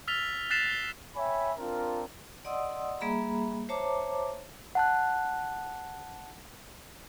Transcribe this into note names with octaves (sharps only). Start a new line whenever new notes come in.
E6 F6 A6 B6 F7 G7
F6 F#6 A6 B6 C7 E7
G7
C#5 E5 G5 G#5 B5
C4 D4 F4 A#4
D5 D#5 F#5 C6 D#6 E6
G3 A#3 G#4 E5 A#5 B5
C5 C#5 E5 A5 A#5 D6
F#5 A5 F#6